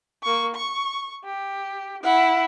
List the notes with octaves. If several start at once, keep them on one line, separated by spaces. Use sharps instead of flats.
A#3 C#6
C#6
G4
E4 F#5